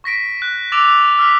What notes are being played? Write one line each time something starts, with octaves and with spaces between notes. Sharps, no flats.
C#6 A#6 B6 D7
F#6
D6 E6 A6 D7 E7 F7
D6 E6 F6 B6